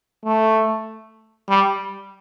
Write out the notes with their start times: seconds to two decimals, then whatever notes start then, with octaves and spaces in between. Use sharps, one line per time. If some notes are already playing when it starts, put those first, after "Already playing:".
0.25 A3
1.49 G3